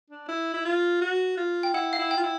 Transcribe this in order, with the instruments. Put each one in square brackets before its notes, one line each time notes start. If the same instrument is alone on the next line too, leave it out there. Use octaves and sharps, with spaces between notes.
[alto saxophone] D4
E4
E4
F4
F#4
F4
[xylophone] G5
[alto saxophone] E4 [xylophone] F#5
[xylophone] F5
[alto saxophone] E4
[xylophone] G5
[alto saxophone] F4
E4